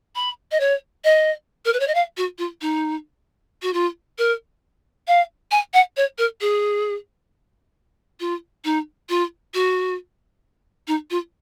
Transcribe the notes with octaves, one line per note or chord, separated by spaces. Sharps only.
B5
D#5
C#5
D#5
A#4
B4
C#5
D#5
F5
F#4
F4
D#4
F#4
F4
A#4
F5
G#5
F#5
C#5
A#4
G#4
F4
D#4
F4
F#4
D#4
F4